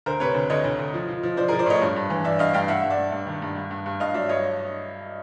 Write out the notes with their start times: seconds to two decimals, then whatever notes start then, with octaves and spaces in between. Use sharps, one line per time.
0.06 D2 A#4 C5
0.20 C3 B4 C#5
0.35 D2
0.49 D2 C#5 D#5
0.64 D2
0.79 D2
0.94 F3
1.09 F3
1.23 F3
1.37 F3 C5 D5
1.48 G#4 A#4
1.52 F3
1.59 C5 D5
1.66 A2 C#5 D#5
1.81 G2
1.96 G2
2.10 E3
2.24 G2 D5 E5
2.39 G2 D#5 F5
2.54 G2 F5 G5
2.68 G2 E5 F#5
2.84 G2
2.90 D5 E5
2.98 G2
3.12 G2
3.27 D#3
3.42 G2
3.56 G2
3.71 G2
3.86 G2
4.00 G2 D#5 F5
4.14 F#3 D5 E5
4.29 G2 C#5 D#5